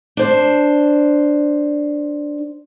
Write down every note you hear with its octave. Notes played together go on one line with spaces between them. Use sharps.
D4 C5